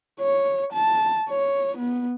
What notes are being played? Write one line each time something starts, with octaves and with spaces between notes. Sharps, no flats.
C#5
A5
C#5
B3